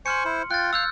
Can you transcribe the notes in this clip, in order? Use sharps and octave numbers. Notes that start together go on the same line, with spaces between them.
C5 G#5 C6 C#6 F6 C#7
E4 C5
F4 G5 F#6 A6
F5 E6 F6 G6